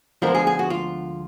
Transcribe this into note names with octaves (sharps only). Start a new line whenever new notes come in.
D2 D3 F3 G#3 B3 A#4
G#4
G#4
F#4
F4